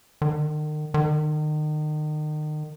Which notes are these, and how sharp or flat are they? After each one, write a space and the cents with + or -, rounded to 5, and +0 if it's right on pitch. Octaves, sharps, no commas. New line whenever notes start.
D#3 -40
D#3 -35